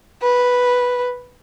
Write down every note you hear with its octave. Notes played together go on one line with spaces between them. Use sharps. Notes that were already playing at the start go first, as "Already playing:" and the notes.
B4